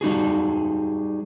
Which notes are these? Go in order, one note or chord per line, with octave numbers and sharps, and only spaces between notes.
G3 D#4 F#4 G#4